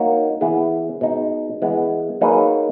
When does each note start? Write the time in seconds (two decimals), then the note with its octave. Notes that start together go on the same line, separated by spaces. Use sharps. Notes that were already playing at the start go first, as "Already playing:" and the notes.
Already playing: A#3 D#4 F#4 C#5
0.41 E3 B3 E4 G#4
1.01 B2 G#3 D#4
1.62 E3 G#3 B3
2.21 F#3 A#3 D#4 G#4 B4